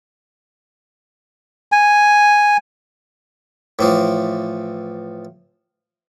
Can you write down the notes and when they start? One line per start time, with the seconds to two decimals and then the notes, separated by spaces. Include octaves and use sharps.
1.72 G#5
3.79 A2 E3 F3